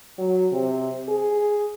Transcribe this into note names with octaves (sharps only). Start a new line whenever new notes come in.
F#3
C3
G#4